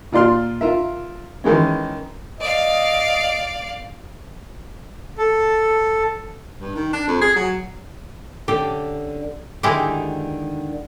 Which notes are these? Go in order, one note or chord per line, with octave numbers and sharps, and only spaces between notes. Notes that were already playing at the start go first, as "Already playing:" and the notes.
A#2 F4 D5 C6 F6
F4 A#4 E5
D#3 E3 G#3 C#4
D5 D#5 F5
A4
G2
D#3
D4
F2
G#4
F#3
D3 C#4 G4 A4
D3 D#3 G#3 E4 G4